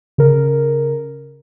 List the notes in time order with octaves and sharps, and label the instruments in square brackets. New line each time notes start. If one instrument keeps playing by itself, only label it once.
[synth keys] C#3 A#4